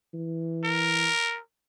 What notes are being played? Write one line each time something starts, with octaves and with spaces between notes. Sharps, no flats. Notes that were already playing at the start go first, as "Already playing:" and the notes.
E3
A#4